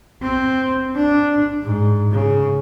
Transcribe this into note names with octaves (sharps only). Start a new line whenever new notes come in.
C4
D4
G#2
C#3